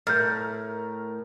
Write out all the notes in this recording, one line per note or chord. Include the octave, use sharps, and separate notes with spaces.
A2 A#4 E5 A5 F6 G6